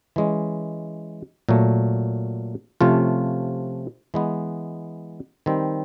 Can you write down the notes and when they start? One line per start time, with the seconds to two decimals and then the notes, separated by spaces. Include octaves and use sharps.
0.16 E3 G#3 C#4
1.49 A#2 F#3 A3
2.81 C3 F3 A3 C#4 F4
4.14 E3 G#3 B3
5.46 D#3 G3 C4